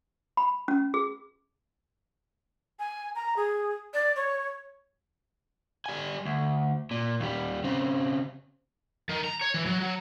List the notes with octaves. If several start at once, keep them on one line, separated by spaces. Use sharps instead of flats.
B5
C#4
G#4
G#5
A#5
G#4
D5
C#5
G3 G#5
D2
A#2
D#2 G3
C#3 C4
D#3
A#5
C#5
E3
F#3
F#3